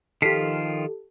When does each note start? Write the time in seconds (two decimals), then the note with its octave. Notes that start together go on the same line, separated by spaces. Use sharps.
0.22 D#3 F3 F4 G4 A4 B6 C7